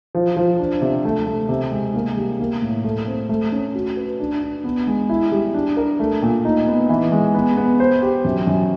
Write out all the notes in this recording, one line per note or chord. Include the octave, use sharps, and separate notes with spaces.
F3
F3
D4
C3
A3
A3
C3
G#3
A#3
G3
A#3
A2
A3
C4
A3
C#4
F#4
B4
D4
D4
B3
G#3
E4
G3
D4
A#4
A3
A#2
D#4
B3
E3
G#3
B3
B3
C5
G4
F#2
F#2